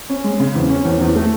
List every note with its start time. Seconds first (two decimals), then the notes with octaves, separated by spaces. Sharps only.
0.09 C#4
0.24 G#3
0.40 C#3
0.55 E2
0.69 C#4
0.85 E2
1.01 E2
1.16 A3